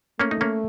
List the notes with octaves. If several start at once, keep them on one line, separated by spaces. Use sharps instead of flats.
A3 A#3 C#4
D#4
A#3 C#4